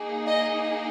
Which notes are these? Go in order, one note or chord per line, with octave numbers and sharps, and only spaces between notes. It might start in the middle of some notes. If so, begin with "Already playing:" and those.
Already playing: A#3 D#4 G#4
D#5